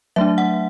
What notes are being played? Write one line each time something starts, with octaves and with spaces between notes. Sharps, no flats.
F#3 A3 D4 E5
F#5